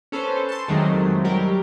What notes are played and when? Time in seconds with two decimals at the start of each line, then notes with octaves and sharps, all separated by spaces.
0.12 C#4 A4 B4 C5
0.49 A5 C6
0.68 F2 C3 D#3 F#3 G#3 A3
1.24 F#3 G3 G4 A#4